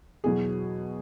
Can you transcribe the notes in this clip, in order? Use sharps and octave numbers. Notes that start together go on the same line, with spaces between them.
E2 B2 F#3 G#4